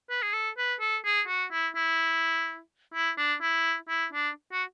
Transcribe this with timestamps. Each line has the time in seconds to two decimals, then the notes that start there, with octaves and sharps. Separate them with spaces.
0.10 B4
0.22 G#4
0.33 A4
0.57 B4
0.80 A4
1.05 G#4
1.28 F#4
1.51 E4
1.76 E4
2.94 E4
3.17 D4
3.41 E4
3.88 E4
4.12 D4
4.52 F#4